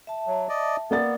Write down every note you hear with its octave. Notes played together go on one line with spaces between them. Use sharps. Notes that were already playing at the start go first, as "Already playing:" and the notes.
E5 A5
F#3
D5 D#5
A#3 B3 D5 A6